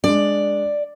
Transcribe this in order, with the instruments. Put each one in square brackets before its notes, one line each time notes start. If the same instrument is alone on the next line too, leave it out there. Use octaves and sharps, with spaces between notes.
[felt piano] G#3 D4 [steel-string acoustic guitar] D5